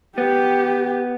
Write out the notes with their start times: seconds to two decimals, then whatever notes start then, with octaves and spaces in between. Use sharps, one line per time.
0.18 B3 G4